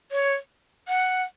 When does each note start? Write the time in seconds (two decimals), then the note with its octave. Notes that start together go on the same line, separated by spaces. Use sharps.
0.12 C#5
0.88 F#5